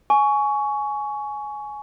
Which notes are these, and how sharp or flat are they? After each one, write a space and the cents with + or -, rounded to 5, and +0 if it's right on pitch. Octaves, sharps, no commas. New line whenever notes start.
G#5 +15 C#6 +15